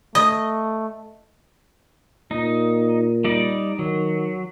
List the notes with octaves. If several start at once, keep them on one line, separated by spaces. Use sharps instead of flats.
A3 D#5
A#2 D#4
G3 D#4 D5
D#3 F#3